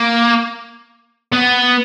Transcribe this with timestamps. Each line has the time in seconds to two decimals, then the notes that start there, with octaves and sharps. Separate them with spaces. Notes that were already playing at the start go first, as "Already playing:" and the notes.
Already playing: A#3
1.32 B3